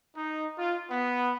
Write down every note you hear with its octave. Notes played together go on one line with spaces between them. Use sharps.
D#4
F4
B3